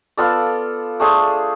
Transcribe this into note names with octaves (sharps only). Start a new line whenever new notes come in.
B3 F4 A4 D5
A3 D4 G#4 C5